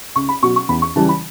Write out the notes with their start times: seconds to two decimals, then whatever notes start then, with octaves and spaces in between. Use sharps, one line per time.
0.16 C#2 C#6
0.29 B5
0.42 B2 F#3 C#6
0.56 C#6
0.69 E2 B5
0.82 C#6
0.96 C#3 E3 G3 A5
1.09 B5